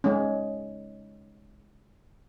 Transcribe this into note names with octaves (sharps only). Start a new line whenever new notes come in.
G#3 C#4